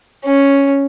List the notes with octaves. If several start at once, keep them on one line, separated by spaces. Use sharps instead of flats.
C#4